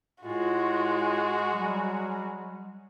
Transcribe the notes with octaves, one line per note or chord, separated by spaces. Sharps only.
A2 G#3 F4 F#4
F#3 G3